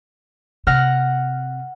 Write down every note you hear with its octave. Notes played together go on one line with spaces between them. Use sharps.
C3 F#5 F6 A#6